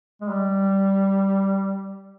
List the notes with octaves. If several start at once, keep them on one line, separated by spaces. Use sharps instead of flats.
G#3
G3